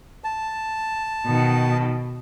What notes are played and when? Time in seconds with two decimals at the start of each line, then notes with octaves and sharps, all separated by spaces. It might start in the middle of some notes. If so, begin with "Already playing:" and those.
0.24 A5
1.26 B2 D#3